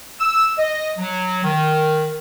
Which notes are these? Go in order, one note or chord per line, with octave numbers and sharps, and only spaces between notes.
E6
D#5
F#3
D#3